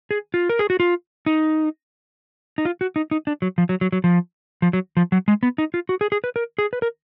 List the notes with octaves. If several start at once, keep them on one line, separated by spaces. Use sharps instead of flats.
G#4
F4
A#4
G#4
F#4
F4
D#4
D#4
F4
F#4
D#4
D#4
D4
F#3
F3
F#3
F#3
F#3
F3
F3
F#3
F3
F#3
G#3
B3
D#4
F4
F#4
G#4
G#4
B4
A#4
G#4
B4
A#4